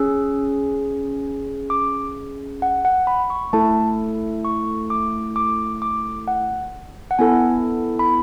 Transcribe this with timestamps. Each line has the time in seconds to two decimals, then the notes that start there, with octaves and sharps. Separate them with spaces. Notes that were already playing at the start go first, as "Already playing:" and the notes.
Already playing: C#4 G#4 E6
1.70 D6
2.62 F#5
2.85 F#5
3.07 B5
3.30 C#6
3.53 A3 E4 A4 A5
4.45 C#6
4.90 D6
5.36 D6
5.82 D6
6.28 F#5
7.11 F#5
7.19 B3 E4 A4 G#5
7.99 B5